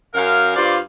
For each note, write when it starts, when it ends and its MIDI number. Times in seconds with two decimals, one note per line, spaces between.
0.14 0.54 42
0.14 0.54 70
0.14 0.54 77
0.55 0.78 43
0.55 0.78 65
0.55 0.78 72
0.55 0.78 74
0.55 0.78 77
0.55 0.78 84